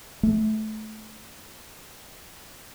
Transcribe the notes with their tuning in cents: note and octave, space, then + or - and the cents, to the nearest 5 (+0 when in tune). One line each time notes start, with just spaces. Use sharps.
A3 -20